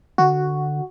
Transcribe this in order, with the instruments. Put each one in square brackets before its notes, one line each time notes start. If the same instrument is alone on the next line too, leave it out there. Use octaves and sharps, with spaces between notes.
[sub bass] D3 [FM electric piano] F#4